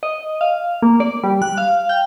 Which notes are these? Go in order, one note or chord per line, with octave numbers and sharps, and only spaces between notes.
D#5
F5
A#3
D5
G3
F#6
F5
G5